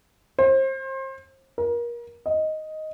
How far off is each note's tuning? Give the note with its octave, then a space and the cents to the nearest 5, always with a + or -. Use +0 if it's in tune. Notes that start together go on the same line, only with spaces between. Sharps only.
C5 +30
A#4 +30
D#5 +5